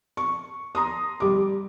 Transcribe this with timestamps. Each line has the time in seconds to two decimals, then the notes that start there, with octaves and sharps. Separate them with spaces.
0.17 C#6
0.75 A#5 C6 D#6
1.20 G3 D6